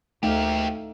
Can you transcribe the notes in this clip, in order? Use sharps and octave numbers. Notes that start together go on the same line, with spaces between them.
D2 A3 A#3 D#4 G4 F5